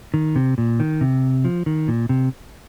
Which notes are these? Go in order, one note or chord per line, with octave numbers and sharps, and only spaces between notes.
D#3
C3
A#2
D#3
C3
F3
D#3
A#2
C3